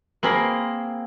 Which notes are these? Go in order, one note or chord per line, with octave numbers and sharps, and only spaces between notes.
A#3 C4 G#4 A#4 B5